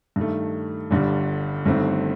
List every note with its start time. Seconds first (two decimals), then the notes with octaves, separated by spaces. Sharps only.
0.16 G2 D#3 A3
0.91 G1 G2 D3 G3
1.66 G1 G2 D#3 A3 C4